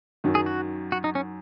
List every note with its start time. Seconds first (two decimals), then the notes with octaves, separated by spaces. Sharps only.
0.24 F#2 D#3 F#3
0.35 G#4
0.46 F#4
0.92 F#4
1.04 D#4
1.15 C#4